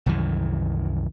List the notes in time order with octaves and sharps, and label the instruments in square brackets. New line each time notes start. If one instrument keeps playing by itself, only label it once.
[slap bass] C2 F#2 D#3 E3